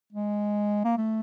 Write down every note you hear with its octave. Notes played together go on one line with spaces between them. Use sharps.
G#3
A#3
A3